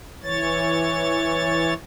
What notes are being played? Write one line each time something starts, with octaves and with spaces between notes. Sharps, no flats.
E3 C#5 A6